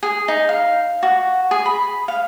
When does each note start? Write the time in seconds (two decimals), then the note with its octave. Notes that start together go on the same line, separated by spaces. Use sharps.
0.03 G#4
0.28 D#4
0.49 F5
1.03 F#4
1.51 G#4
1.66 B5
2.08 F5